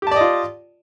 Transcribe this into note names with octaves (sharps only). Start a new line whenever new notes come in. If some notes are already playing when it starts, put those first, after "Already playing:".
F4 G4 D5 D#5 A5